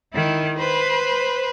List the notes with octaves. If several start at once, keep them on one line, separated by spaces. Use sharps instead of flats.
D#3 E4
B4 C5